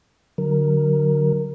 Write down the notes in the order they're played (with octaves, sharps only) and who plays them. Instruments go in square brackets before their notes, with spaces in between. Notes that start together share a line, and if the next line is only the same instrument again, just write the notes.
[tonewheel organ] D3 F#3 A#4